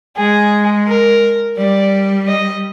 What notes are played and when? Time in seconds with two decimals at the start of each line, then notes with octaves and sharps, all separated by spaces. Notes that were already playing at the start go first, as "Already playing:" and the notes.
0.17 G#3 G#4
0.88 A#4
1.57 G3 D5
2.28 D#5